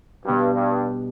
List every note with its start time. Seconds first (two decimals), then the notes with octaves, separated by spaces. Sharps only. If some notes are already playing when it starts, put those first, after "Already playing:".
0.25 G2 B2 G3 B3 D4 G4
0.54 G2